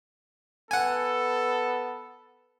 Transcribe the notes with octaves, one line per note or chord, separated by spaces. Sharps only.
B3 A4 F#5 G#5